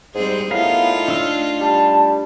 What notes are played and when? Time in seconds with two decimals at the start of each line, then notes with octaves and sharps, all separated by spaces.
0.14 G#2 G3 C4 G#4
0.51 A2 A3 B3 D#4 F4 A#4 F5
1.08 D4 E6 F6
1.60 G3 A5